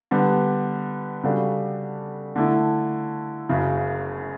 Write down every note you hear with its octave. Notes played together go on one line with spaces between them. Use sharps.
D3 G3 B3
C#3 G3 D4 F#4 A4
D3 A3 E4
F#1 F#2 C#3